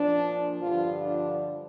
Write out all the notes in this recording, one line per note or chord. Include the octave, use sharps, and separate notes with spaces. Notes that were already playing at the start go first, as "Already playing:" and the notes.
Already playing: A#2 F3 D4
G2 D3 F3 F4
D4